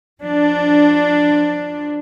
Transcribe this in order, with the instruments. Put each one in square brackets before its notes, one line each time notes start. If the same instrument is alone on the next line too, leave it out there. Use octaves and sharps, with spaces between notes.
[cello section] F3 D4